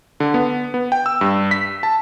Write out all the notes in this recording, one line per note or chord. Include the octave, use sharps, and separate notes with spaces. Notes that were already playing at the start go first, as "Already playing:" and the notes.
D3
B3
B3
G5
E6
G2
B6
A5